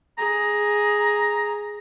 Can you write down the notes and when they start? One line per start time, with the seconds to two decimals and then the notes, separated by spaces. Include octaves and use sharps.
0.18 G#4 A#5